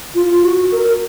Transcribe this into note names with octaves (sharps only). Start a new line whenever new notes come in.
F4
F#4
A#4